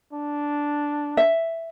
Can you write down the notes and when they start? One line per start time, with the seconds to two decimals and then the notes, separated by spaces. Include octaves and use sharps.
0.13 D4
1.17 E5